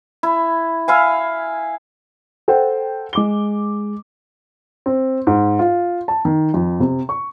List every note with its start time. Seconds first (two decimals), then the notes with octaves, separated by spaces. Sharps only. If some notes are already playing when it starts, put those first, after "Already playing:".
0.23 E4
0.88 E4 F5 G#5
2.48 A4 C5 F#5 G5
3.13 G#3 D6 G7
4.86 C4
5.27 G#2
5.59 F4
6.08 A5
6.25 D#3
6.54 F2
6.80 C3
7.09 C#6